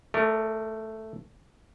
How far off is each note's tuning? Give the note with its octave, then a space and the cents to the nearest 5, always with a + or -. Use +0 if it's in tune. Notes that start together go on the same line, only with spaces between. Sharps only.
A3 +0 A#4 -30 D5 +10